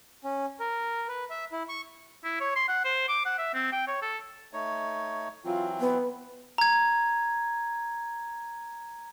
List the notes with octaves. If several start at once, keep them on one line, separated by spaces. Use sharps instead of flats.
C#4
A#4
B4
E5
E4
C#6
E4
C#5
C6
F#5
C5
D6
F#5
E5
C4
G5
C#5
A4
A3 D#4 C#5
E3 F#3 C4 F4
B3
A#5 G#6